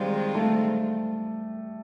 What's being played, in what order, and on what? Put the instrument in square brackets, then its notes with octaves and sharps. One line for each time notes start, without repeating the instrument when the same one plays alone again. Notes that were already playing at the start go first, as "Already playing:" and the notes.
Already playing: [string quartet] D#3 G#3 C4 F4 [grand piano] G3
[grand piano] A3